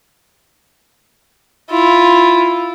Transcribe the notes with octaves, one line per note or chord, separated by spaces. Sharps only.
E4 F4